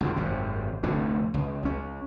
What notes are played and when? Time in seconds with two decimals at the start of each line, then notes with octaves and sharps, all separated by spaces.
0.01 C#2 F#2 D#3
0.16 G#1 F#2 C3
0.83 F1 D2 A2 D3
1.34 C#2
1.63 C#2 C#4